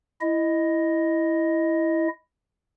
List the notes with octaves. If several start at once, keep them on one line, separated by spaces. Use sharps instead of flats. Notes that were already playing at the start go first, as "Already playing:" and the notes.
E4 D#5